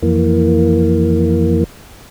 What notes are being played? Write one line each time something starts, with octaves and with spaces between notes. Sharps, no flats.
F2 E3 A#3